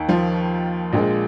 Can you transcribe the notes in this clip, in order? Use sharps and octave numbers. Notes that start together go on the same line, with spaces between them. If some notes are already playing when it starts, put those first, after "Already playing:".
Already playing: D#2 D#3
F3 F4
A#1 A#2 G#3